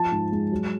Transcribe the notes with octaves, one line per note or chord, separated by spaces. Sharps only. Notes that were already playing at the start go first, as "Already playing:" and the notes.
Already playing: F3 A5
G#2
G#3
F#3